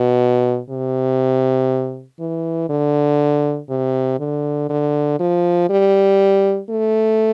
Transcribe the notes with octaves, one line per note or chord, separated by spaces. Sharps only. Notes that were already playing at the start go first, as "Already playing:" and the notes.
Already playing: B2
C3
E3
D3
C3
D3
D3
F3
G3
A3